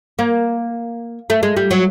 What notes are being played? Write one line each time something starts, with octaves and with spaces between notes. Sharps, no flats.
A#3
A3
G#3
G3
F#3